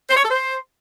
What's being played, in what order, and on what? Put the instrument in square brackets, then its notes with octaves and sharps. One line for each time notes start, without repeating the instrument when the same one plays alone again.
[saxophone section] C5
C#5
A4
C5